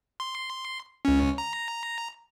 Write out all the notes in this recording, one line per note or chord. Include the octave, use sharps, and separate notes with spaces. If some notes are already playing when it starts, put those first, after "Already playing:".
C6
C#2 C#4
A#5